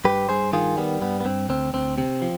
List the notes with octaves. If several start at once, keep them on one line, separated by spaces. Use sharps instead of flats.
G2 G4 B4
G2 G#4 C5
D#3 F4 G#4
G3 B3
G2 B3
B3
G2 C4
D2 C4
D2 C4
C3 C4
F3